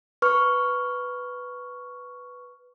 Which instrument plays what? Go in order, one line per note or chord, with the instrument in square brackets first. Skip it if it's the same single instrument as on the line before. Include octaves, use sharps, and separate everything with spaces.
[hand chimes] B4 C#6 F6